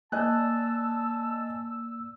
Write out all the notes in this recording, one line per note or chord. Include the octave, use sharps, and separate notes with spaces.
A#3 D5 D#5 G#5 A5 E6 F#6